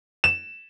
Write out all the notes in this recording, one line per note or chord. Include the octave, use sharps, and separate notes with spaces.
E7